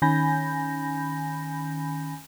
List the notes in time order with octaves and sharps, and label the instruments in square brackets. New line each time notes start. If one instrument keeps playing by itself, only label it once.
[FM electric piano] D#3 C#4 G#5 B5 G6 A#6